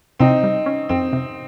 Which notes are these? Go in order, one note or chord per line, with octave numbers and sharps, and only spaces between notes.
C3 C4 D#4
G3
C#4
F2 C4
C3